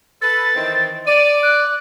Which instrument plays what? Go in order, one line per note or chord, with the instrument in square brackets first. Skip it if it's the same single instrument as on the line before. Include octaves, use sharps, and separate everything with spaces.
[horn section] A4 B4 [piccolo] A6
[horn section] D#3 E3 C4
[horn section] D5 [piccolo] D#7
[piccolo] F#6